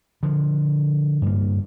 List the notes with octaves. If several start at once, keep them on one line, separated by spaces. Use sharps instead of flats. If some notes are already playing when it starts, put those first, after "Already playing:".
D3 F3
G2 A#3